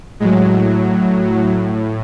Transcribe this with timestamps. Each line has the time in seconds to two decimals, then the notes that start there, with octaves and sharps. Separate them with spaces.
0.20 A2 F#3 G#3
0.50 F#3